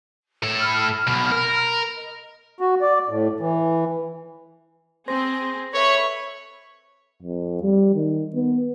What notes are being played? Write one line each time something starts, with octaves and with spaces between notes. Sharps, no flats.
A2 A4
B5 F6
B1 B2
A#4
D#5
F#4
D5
A2
E3
C4 G#4 C5 C6 A#6
A4 B4 C#5 E5 B5 C#6
F2
G3
D#3
B3